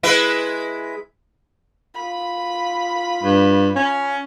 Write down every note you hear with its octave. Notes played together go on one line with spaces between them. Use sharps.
G#3 E4 B4
F4 B5
G2
C#4